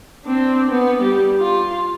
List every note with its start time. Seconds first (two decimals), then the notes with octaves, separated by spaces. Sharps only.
0.25 C4 D4
0.71 B3
1.02 G3
1.40 F4